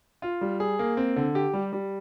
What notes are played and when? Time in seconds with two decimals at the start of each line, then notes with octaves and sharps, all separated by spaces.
0.22 F4
0.41 G3
0.60 G#4
0.79 A#3
0.97 C4
1.16 D3
1.35 G4
1.53 G3
1.73 G3